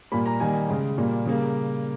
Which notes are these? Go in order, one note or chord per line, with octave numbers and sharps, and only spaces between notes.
A#2 G3 A#3 B5
A#5
D#3 G3 A#3 G#5
C#3 G#3
A#2 G3 A#3
C#3 G3 A#3